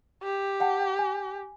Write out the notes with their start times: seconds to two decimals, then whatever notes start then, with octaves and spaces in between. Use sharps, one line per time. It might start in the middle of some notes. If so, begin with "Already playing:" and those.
0.23 G4
0.60 F#5 G5 A5
0.99 G#5